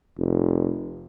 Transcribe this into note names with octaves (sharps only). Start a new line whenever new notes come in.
F1